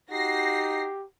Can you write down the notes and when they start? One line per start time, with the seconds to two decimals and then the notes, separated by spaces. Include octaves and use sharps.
0.11 D#4 F#4 G4 A#6 C7